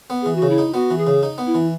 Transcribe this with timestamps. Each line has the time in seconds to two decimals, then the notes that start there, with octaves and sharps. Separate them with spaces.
0.10 B3
0.22 E3 G#4
0.36 F#4
0.42 C#3
0.50 E4
0.58 D#4
0.74 B3 F#4
0.90 E3
0.98 G#4
1.07 C#3
1.23 D#4
1.38 B3
1.47 E4
1.55 E3